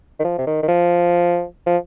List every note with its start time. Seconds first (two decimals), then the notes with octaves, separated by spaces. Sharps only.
0.19 D#3
0.24 F3
0.38 C3
0.47 D#3
0.63 D#3
0.68 F3
1.66 F3